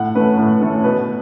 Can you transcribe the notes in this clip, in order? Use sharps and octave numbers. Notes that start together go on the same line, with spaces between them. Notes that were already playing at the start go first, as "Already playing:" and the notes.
Already playing: A2 F#5
E3 A3 C#4 B4
A2
E3 A3 C#4 A4
B2 B4